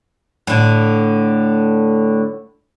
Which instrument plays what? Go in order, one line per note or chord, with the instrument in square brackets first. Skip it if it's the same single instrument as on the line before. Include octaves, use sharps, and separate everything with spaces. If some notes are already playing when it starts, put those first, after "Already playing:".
[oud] A2 D3